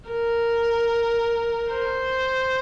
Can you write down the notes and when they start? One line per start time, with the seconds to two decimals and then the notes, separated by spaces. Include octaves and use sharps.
0.10 A#4
1.72 C5